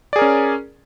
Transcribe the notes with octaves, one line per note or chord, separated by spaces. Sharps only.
C#4 G#4 A#4 D5